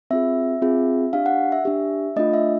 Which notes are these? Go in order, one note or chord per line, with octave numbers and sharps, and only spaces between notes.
C4 F4 G#4 E5
C4 F4 G#4
D4 G4 F5
F#5
E5
D4 G4
A3 D4 F4 D#5
E5